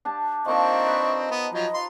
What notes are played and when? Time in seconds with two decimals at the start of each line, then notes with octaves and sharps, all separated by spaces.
0.05 D4 G4 A5
0.46 F3 A#3 C4 D4 D#4 D#5 C#6
0.87 B4
1.31 B3
1.54 F3 F#3 D#5
1.74 F4 C6